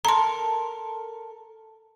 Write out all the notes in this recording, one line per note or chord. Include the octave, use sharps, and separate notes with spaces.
A4 A#4 A#5 C6